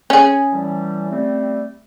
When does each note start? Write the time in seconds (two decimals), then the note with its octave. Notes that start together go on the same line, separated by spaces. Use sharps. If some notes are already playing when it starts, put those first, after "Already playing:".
0.10 C#4 G#4
0.52 A2 E3 G3
1.11 G3 A3 C4